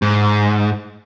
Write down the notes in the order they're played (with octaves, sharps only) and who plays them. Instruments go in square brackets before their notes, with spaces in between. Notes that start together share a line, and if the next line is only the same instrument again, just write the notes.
[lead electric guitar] G#2